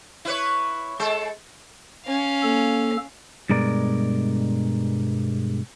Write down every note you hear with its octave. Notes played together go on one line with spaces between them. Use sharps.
E4 B4 C#5
G#3 A4
C#4 F5
A#3 A4
G2 B2 G#3 A#4 D5